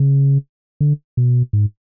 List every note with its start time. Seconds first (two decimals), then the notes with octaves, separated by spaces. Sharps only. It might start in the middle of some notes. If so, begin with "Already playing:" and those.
Already playing: C#3
0.81 D3
1.17 B2
1.53 G#2